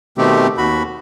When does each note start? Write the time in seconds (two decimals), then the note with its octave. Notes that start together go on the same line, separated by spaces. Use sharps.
0.18 B2 D#3 A3 C4 G4
0.58 D#2 F#4 B5